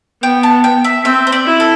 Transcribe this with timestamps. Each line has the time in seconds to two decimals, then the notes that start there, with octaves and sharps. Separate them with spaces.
0.22 B3 G5
0.43 A5
0.64 G5
0.84 E5
1.05 C4 E5
1.27 C5
1.32 D5
1.46 E4
1.60 A4